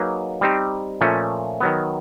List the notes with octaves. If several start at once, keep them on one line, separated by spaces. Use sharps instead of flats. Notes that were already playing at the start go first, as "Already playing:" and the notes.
Already playing: F#3 A#3 D#4 G#4 B4
G3 C4 D#4 G4 C5
A#2 F3 A3 C#4
D#3 F#3 B3